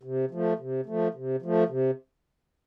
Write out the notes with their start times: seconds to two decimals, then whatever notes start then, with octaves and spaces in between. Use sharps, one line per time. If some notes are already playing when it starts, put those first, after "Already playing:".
0.03 C3
0.31 F3 A3
0.59 C3
0.86 F3 A3
1.14 C3
1.42 F3 A3
1.69 C3